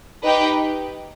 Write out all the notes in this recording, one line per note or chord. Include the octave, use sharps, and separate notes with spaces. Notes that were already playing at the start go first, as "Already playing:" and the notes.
D#4 G4 B4 G5